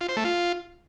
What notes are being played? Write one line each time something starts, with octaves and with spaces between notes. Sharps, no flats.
F4
C5
A3
F4